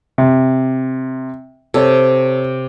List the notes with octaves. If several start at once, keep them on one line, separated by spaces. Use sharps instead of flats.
C3
C3 A4 C#5